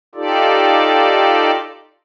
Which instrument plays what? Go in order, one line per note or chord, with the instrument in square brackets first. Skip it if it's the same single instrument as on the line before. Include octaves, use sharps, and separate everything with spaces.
[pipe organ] D#4 F4 G4 A4 D5